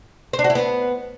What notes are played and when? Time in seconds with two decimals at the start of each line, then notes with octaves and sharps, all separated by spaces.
0.33 C5
0.39 D4
0.44 F#4
0.50 E4
0.55 B3